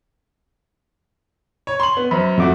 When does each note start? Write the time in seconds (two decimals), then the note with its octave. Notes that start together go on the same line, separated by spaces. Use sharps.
1.67 C#5
1.80 C6 F#7
1.97 B3
2.11 F#2 C5 B5
2.38 F2 A3 F#4 D6